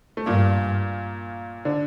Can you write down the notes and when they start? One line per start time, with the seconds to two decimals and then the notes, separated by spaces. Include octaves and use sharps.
0.17 A3
0.26 G2 A#2 A#3
1.65 D3 D4